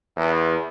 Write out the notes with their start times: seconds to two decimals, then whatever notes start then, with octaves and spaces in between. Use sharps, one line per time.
0.17 E2